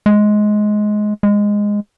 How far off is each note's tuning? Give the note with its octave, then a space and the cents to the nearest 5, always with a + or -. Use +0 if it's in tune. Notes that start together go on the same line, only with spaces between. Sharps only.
G#3 +15
G#3 -10